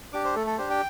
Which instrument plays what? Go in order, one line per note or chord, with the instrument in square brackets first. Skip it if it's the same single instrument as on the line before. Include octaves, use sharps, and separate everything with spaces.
[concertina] D4 G4 D6
C5
A3 A4
A4
D4 G4 C5
G5